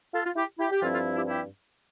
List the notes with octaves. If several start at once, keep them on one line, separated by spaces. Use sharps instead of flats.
F4 A4
F4
E4 G4
E4 G4
G4
G2 F3 C4 E4 F4 A4
F4 A4
E4 G4
E4 G4